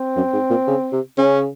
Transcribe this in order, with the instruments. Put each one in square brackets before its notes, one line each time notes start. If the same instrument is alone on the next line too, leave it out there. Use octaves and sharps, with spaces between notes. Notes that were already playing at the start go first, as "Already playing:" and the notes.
Already playing: [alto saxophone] C4
[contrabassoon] F#2
G#2
A#2
C#3
C3
[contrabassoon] C#3 [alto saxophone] C#4